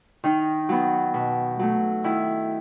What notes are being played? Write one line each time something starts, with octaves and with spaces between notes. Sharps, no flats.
D#3 D#4
F#3 B3
B2
F#3 A3
D#3 E4